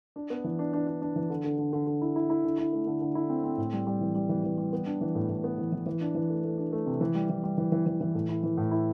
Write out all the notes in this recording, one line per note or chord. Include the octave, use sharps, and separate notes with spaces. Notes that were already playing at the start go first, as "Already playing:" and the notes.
D4
B3
E3
D4
D4
D4
D4
E3
D3
D3
D3
D3
D3
E4
E4
E4
D3
E4
A3
D3
D3
E4
C4
C4
A2
G3
G3
E3
G3
E3
E3
G3
B3
D4
E3
A2
A2
B3
E3
E3
E3
D4
E3
A3
A3
D4
A3
C3
E3
G3
E3
G3
E3
E3
E3
E3
A2
E4
E3
A2
E4